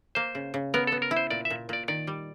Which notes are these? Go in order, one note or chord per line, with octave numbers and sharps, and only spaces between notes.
A#3 C5
C#3
C#3
B3 A#4
B3 A4
A#4
E4
C5
A#2 D5
E5
A#2
A#2 D5
D#3 D5
G3